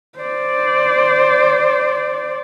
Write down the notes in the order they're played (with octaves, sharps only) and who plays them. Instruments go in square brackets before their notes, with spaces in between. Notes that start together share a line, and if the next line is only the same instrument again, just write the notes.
[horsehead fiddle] C5 D5